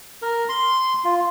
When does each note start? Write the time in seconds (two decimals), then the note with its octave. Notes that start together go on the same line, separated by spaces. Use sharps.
0.22 A#4
0.49 C6
1.04 F4